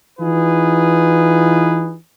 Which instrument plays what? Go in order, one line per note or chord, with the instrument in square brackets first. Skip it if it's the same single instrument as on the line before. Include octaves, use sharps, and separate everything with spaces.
[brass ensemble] E3 D#4 F4 G#4 B4